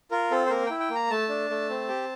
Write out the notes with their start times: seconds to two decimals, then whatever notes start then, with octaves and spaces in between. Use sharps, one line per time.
0.11 F4 A#4
0.31 C4 A4
0.46 C5
0.50 A#3 A#4
0.66 E4 G5
0.80 G5
0.90 A#3 A#5
1.10 A3 A5
1.29 D4
1.50 A3
1.69 C4
1.89 G4